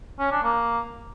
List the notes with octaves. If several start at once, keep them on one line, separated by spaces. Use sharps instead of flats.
C#4
D4
A#3